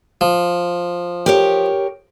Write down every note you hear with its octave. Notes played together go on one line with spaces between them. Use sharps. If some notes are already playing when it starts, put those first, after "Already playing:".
F3
G4 A#4 C#5